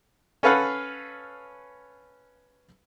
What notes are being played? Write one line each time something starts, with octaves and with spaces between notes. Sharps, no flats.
C#4 A4 B4 F5 F#5 B5